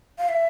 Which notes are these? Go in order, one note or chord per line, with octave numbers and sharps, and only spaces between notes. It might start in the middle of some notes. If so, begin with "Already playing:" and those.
F5
E5